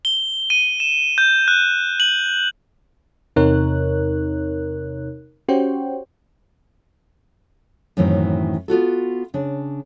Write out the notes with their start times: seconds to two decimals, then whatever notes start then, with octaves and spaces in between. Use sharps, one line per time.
0.05 G7
0.50 D#7
0.80 E7
1.18 G6
1.48 F#6
2.00 F#7
3.36 E2 C3 D#4 A#4 C#5 F#6
5.48 C#4 F#4 G4 C5 C#5 G5
7.97 F#2 A2 D#3 E3 C4
8.68 B3 F4 F#4 A4
9.34 C#3 D4